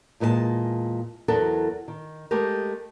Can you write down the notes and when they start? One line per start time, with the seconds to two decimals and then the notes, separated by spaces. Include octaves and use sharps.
0.20 E2 A#2 G#3 A4 A5
1.28 E2 F#3 A4 A#4
1.88 D#3
2.31 G#3 A3 G4 A#4